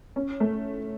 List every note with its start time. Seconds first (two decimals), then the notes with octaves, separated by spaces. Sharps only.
0.16 C#4
0.40 A3